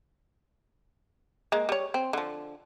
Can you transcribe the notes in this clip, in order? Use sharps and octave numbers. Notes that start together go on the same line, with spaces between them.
G#3 A#3
G3 C#5
C4
D3 F3